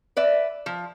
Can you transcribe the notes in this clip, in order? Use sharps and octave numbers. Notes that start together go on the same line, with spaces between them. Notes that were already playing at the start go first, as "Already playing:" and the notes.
B4 D5 E5
F3